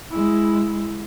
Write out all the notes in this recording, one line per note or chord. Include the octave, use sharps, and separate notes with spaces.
G#3 E4